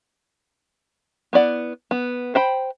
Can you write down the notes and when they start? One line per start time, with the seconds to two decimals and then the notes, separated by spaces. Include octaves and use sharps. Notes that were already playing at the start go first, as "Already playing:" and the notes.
1.33 B3 E4 D5 F#5
1.91 B3
2.35 C5 G5 B5